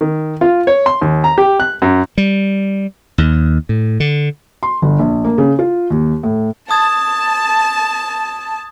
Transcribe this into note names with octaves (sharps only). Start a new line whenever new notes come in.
D#3
F4
C#5
C6
D#2
A#5
G4
F#6
F#2
G3
D#2
A2
D3
C6
G1
A#1
A#3
C#3
F4
D#2
A2
A5 D#6 G#6